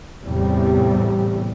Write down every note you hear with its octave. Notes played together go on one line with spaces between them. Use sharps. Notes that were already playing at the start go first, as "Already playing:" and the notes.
E2 A2 C3 G3